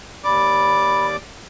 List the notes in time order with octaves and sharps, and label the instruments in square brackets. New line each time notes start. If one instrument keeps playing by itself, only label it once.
[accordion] D#2 D5 D6 [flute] B5